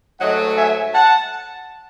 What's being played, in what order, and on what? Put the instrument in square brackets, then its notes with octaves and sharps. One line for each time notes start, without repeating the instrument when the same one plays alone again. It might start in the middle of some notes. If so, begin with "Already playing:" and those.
[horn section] G#2 F#3 A3 D#5 F#5
E5 G#5
F#5 A5